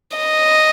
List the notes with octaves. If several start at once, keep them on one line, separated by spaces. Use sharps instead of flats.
D#5